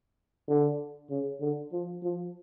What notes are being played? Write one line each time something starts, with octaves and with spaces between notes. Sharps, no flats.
D3
C#3
D3
F3
F3